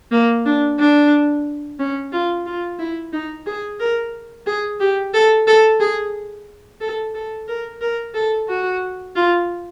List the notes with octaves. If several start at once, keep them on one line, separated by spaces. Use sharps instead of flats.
A#3
D4
D4
C#4
F4
F4
E4
D#4
G#4
A#4
G#4
G4
A4
A4
G#4
A4
A4
A#4
A#4
A4
F#4
F4